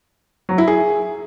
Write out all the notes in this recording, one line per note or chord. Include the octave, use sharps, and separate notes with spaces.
F#3
E4
G#4